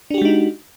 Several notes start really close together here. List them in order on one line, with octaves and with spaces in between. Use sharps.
D4 G4 F#4 G#3 D#4